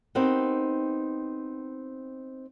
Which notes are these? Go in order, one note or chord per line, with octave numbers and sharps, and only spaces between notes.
B3 C4 D#4 G4 A#4 F#5